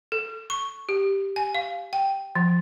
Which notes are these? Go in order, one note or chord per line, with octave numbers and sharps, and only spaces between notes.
A4
C#6
G4
G#5
F5
G5
F3